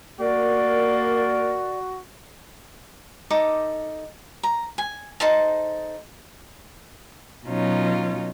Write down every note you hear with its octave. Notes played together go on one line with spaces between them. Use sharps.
A#3 F#4 A#4 D5
D#4 A4 D6
A#5
G#5
D#4 A4 C5 A5
B2 F#3 C#4 D#4 F4